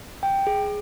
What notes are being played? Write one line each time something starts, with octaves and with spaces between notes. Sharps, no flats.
G5
G#4